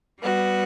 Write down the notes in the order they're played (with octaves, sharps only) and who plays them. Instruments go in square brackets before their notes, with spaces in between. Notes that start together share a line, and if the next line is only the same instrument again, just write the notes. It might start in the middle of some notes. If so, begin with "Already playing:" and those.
[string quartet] G3 B3 F#4